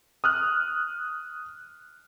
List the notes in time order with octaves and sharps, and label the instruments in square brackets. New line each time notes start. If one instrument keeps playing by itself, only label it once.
[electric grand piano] D#6 F6 F#6